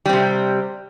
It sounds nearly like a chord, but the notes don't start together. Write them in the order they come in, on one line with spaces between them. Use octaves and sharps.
G3 C4 C3